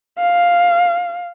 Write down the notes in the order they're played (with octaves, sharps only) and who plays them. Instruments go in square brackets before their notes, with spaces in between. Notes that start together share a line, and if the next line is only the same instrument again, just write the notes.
[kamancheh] F5